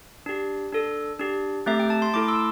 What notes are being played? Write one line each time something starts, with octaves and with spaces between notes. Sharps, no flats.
D4 G4
D4 A4
D4 G4
A3 C4 G4 E5
G5
A5
C6
A3 E4 A4 A5 D6
C6 E6